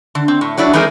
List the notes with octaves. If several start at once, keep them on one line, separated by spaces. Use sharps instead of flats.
D3
C4
A2
F#3 D4 E4 D5
E3 G#3 C4 D#4 G#4 A#4